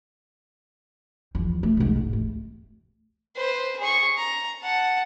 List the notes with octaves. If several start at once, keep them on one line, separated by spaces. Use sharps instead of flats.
E2 F3
A3
B1 G#2
G#2
A3
B4 C5
G#4 C#6
A#5
F#5 A5